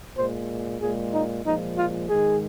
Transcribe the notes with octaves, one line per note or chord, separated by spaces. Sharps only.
A#2 G#3 C5
A#2 G#3 G#4
D#4
A#2 F3 G#3 D#4
F4
G#2 D#3 G#3 G#4